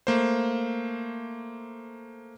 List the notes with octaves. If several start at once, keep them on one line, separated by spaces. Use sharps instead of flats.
A3 A#3 C5